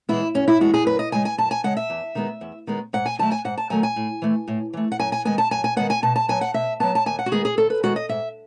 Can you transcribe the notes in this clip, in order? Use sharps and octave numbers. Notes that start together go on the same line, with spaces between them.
E3 G#3 B3 E4
F#2 C#4
E4
E3 G#3 B3 F#4
G#4
F#2 B4
D#5
C#3 G#3 G#5
G#5
F#2 A5
G#5
C#3 G#3 F#5
E5
E2
D#3 G#3 B3
E2
D#3 G#3 B3
G#2 F#5
G#5
D#3 F#3 A3 A5
G#5
G#2 F#5
A5
D#3 F#3 A3 G#5
G#5
A2
E3 A3
A2
E3 A3
F#5
F#2 G#5
G#5
D#3 G#3 B3 G#5
A5
F#2 G#5
G#5
D#3 G#3 B3 F#5
G#5
B2 A5
A5
F#3 B3 G#5
F#5
B2 E5
F#3 B3 A5
A5
D#2 G#5
F#5
F#4
D#3 G#3 B3 G#4
G#4
D#2 A4
B4
D#3 G#3 B3 F#4
D#5
G#2 E5